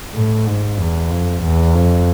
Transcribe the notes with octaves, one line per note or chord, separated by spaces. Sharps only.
A2
G#2
E2
F2
E2
F2